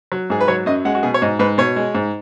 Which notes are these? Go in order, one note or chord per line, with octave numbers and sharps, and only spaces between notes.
F#3
G#2 G#4
B4
F#3 C#5
F#2 D#5
G#3 F#5
F#4
B2 G#4
C#5
G#2 D#5
G#2 B4
B2 C#5
G#3
G#2